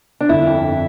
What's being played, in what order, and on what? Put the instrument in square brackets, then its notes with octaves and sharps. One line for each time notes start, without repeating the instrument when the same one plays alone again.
[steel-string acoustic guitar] D4
[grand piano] G1 [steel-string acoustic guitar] E4
[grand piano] F2